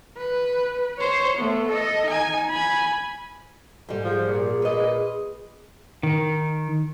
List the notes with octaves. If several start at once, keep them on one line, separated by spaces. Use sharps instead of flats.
B4
C5 C#5
A3 B3
A4 D#5
D#4 G#5
G#5 B5
G#2 G3 A4
F3 G#4
A#2
B4 D#5
D#3